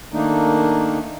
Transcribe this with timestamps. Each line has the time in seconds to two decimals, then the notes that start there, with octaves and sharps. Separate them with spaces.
0.12 D#3 A3 A#3 D4 D#4